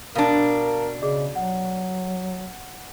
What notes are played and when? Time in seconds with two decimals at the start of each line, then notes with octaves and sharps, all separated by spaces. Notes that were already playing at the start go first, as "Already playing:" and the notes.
0.15 B2 D4 A#4 F5 A5
1.01 C#3 G#4 D5 D#5
1.36 F#3 F#5